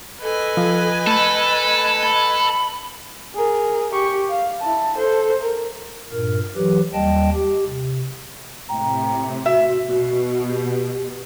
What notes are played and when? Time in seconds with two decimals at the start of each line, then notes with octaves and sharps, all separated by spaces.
0.23 A4 B4 D#5 G#5
0.57 F3
1.07 A3 A4 B5
2.03 A5 B5
3.35 G#4 A#4
3.92 G4 C#6
4.30 F5
4.62 E4 A5
4.97 A4 C5
5.42 A#4
6.12 G2 A#2 A#4
6.56 E3 F#3 G4 B4
6.93 D#2 G3 D#5 G5 A5
7.35 G4
7.67 C3
8.69 A2 C3 G5 A#5
9.46 F#4 E5
9.90 B2 F#4
10.49 G4